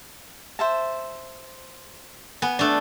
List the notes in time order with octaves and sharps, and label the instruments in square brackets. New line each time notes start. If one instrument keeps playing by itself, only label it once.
[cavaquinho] C5 E5 A5
[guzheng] B3 [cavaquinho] G#5
[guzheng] A3 D4